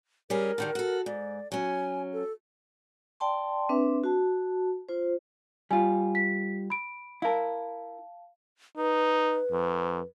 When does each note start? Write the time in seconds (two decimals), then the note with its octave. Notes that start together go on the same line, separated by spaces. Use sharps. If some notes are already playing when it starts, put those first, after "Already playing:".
0.30 G3 C#4 G#4 A#4
0.58 D3 D#3 G3
0.75 F#4 A4
1.06 G#2 D5
1.52 F#3 C#4 G#5
2.13 A4
3.20 D5 G5 A5 C6
3.69 C4 D4 B4 E5
4.04 F#4 A5
4.89 F4 C5
5.71 G3 F4 G#5
6.15 B6
6.70 B5 D7
7.22 E4 A#4 F5 A5
8.77 D#4 B4
9.51 F2